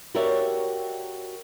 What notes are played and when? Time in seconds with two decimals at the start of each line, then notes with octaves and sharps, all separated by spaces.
0.15 F#4 G4 A#4 C#5 D5 E5